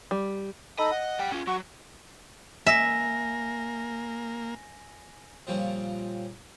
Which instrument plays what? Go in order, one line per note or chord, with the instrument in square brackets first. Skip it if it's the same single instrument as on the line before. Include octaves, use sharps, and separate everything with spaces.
[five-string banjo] G3
[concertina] D#4 A4 B5 [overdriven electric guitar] D#5
[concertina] F#5
[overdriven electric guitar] G3 G5
C#4 F4
[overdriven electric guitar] F#3 [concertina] F#4 C#6
[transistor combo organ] A#3 [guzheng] E5 [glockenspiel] G#5 A#6
[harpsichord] A#2 C#3 F3 G3 C4